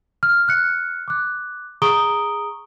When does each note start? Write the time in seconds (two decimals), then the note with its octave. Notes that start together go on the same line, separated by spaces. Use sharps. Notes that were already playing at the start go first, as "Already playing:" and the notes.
0.23 F6
0.48 F6 F#6 C#7
1.08 D6 F#6
1.82 G#4 A#5 C#6 D#6 D7 G7